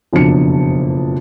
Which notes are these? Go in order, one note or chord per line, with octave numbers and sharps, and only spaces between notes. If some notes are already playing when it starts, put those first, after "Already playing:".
F#1 F2 B2 D4 C#7